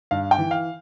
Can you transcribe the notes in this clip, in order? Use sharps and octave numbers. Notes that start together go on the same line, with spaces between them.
G2 F5
G5
E3
F5